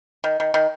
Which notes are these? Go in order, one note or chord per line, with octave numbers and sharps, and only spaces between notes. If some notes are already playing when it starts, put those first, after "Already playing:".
D#3
D#3
D#3